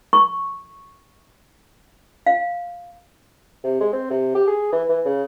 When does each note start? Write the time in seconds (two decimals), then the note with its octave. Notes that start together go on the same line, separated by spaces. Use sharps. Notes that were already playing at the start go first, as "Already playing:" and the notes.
0.13 C#6
2.26 F5
3.64 C3
3.80 G#3
3.92 C4
4.10 C3
4.35 G4
4.48 G#4
4.72 E3
4.89 E3
5.05 C#3